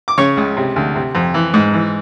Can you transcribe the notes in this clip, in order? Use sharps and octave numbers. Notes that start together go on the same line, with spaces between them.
D6
C#3 C#5 C#6
C#2
C3
D2
C3
F2
E3
G#2
E3